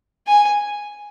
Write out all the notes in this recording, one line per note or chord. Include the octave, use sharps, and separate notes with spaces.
G#5